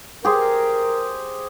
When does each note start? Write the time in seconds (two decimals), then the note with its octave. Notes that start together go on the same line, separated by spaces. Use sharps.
0.25 G4 G#4 A#4 C5